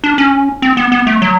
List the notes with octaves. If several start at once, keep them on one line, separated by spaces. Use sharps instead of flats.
D4
C#4
C4
B3
B3
A3
F#3